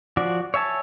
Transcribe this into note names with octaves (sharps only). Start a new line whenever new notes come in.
F3 F#4 D5
C#5 E5 G#5 A5